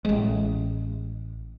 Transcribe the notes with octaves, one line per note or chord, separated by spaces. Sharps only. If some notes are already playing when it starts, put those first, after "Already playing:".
A1 G#3